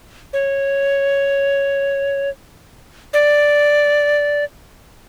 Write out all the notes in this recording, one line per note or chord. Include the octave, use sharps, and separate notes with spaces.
C#5
D5